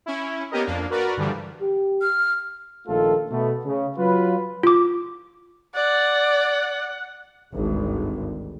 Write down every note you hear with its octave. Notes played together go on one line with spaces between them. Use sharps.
C#4 E4
A#3 B3 C#4 G4 A#4 D#5
F2 A#3 D4
F#4 A#4 B4 D5
G2 D3 E3 F3 G3
G4
F6
A#1 D#3 A3 F4 A4
B2 A3 B3
C#3
F#3 F4 B4
F4 D6
D5 F#5
G#1 D2 G2